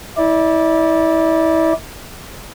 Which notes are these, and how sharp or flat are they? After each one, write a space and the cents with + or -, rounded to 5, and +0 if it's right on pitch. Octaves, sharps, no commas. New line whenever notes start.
E4 -30 D5 +0